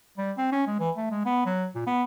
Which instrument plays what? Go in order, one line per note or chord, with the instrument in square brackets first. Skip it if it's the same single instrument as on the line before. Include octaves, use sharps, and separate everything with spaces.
[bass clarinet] G3
C4
C#4
G#3
E3
A3
G#3
B3
F#3
A#2
B3